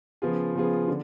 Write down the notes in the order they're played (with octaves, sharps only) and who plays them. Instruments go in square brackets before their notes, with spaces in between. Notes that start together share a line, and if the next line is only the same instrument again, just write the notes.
[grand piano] C#3 F3 B3 F4 G#4
C#3 F3 B3 F4 G#4
D3